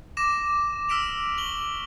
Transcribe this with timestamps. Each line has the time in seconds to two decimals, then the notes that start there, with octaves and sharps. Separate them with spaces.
0.17 D6 A#6 E7
0.89 E6 F6 B6 D7 E7 F7
1.37 C#6 F#7 G7